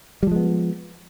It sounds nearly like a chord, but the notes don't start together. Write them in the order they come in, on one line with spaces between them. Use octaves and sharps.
G3 F3 G#3 B3